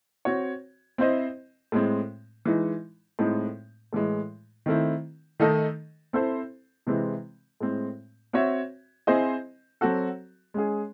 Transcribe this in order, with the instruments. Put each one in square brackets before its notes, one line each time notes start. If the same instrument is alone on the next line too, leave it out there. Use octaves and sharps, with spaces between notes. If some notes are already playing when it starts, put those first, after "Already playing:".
[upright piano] C4 F#4 C#5
C4 E4 C5 D#5
A2 G#3 C4
E3 G#3 D#4
A2 G#3 C4 D#4
A2 E3 G#3
D#3 A3 C4 E4
D#3 A3 D#4 A4 D#5
C4 E4 A4 C5
C3 E3 G#3 C4
A2 G#3 C4
C4 F#4 C#5 E5
C4 E4 G#4 C5 D#5
F#3 C4 F#4 A4
G#3 C#4 G#4